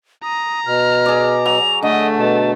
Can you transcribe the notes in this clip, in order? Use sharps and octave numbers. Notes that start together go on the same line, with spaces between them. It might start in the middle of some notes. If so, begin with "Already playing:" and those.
A#5 D#6
B2 F6
G#4 D5
F#3 F7
D3 A3 D#5
B2 A5